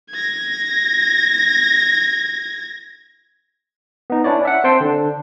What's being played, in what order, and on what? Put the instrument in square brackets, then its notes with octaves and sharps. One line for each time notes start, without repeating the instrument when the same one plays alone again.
[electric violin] G#6 A#6
[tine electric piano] B3 D#4
C#4 D4 E4 C#5 D5
E5 F#5
C4 C5 G5 A5 C6
D3 D4